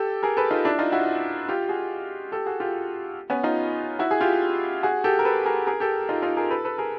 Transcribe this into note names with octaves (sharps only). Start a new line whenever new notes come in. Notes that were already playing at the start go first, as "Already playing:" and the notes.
Already playing: G4 A4
G#4 A#4
A4 B4
D#4 F4
D4 E4
D#4 F4
E4 F#4
F4 G4
F#4 G#4
G4 A4
F#4 G#4
F4 G4
B3 C#4
D#4 F4
E4 F#4
G#4
F4 G4
F#4 G#4
G4 A4
A#4
A4 B4
G#4 A#4
G#4 A#4
G4 A4
D#4 F4
D#4 F4
G#4 A#4
A4 B4
A4 B4
G#4 A#4